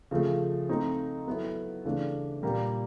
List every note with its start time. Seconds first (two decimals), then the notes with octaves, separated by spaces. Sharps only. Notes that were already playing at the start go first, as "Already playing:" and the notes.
0.11 C#3 F3 A3
0.69 A3 C4 D#4
1.27 F#3 B3 E4 A4
1.85 C#3 E3 A3 D4
2.43 A#2 G3 A#3